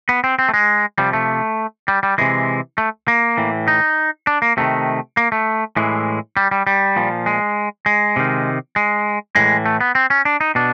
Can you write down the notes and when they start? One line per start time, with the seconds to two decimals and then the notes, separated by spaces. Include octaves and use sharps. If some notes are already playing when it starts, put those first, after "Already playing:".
0.09 B3
0.24 C4
0.39 C4
0.49 A3
0.54 G#3
0.98 C3 F3 G3
1.13 A3
1.88 G3
2.03 G3
2.18 C3 E3 G#3
2.78 A3
3.08 A#3
3.38 A2 E3
3.68 D#4
4.27 D4
4.42 A#3
4.57 C3 D#3 A3
5.17 A#3
5.32 A3
5.76 A2 E3 G#3
6.37 G3
6.51 G3
6.67 G3
6.96 A#2 F3
7.26 G#3
7.86 G#3
8.16 C3 D#3
8.76 G#3
9.35 A2 E3 G#3
9.66 A3
9.81 B3
9.95 C4
10.10 C#4
10.25 D4
10.41 D#4
10.55 B2 D4